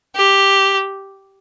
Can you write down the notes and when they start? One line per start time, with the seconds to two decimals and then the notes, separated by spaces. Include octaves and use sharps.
0.15 G4